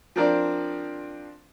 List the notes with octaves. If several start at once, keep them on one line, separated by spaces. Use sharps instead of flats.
F3 C4 D4 A#4 D5